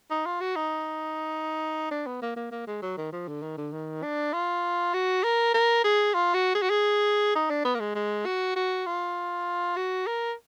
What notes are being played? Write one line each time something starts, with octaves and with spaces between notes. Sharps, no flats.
D#4
F4
F#4
D#4
D4
B3
A#3
A#3
A#3
G#3
F#3
D#3
F3
D3
D#3
D3
D#3
D4
F4
F#4
A#4
A#4
G#4
F4
F#4
G#4
F#4
G#4
D#4
D4
B3
A#3
G#3
G#3
F#4
F#4
F4
F#4
A#4